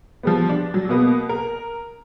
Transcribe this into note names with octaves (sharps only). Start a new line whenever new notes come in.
F3 G3 B3
D4
F#3
B2 A#3 B3
A#4